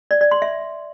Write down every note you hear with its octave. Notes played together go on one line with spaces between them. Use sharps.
D5
D5
C6
E5